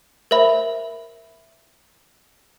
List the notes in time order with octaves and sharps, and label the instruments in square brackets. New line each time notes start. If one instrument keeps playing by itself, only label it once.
[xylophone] A#4 C5 E5 B5